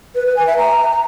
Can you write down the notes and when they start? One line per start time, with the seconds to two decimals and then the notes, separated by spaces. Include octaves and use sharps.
0.15 B4
0.26 B4
0.37 G#5
0.47 E5
0.58 A#5